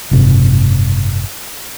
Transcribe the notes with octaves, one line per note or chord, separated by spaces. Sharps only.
F#1 G#2 C3